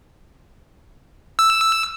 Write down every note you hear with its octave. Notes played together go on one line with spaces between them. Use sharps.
E6